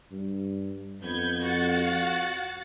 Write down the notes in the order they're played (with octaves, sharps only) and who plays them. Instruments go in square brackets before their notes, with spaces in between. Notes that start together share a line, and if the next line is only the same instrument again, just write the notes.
[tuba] G2
[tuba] F2 [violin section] B3 G6 G#6
[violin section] F#4 F#5 A6